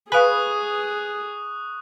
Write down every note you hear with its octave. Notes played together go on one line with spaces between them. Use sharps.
G#4 B4 F5 G#5 C#6 D#6 F#6